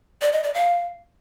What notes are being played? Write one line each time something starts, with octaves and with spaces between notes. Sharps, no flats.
D5
D#5
D5
F5